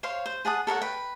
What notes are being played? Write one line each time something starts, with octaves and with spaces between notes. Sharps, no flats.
C5 C#5 F5 C6
C5
G#4 F#5 A5 D#6
A4 A#4 C#5 F#5
B4 G5